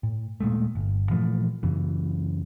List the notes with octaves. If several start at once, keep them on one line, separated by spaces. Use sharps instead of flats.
A2
D#1 A#2 G#3 A3
G1
A#2 E3 F3 A3
F#2 C#3 E3